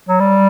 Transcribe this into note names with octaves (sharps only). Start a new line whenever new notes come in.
F#3
G3